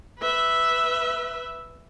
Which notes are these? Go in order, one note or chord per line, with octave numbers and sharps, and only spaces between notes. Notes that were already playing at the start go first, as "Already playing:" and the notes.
B4 E5